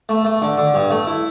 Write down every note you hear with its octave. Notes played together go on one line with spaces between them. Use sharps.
A3
A3
D3
D3
G2
A3
E4